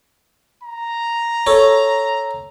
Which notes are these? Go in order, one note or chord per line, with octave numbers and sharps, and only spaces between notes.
A#5
A4 C#5